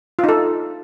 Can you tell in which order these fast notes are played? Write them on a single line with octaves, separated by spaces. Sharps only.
F4 D#4 A4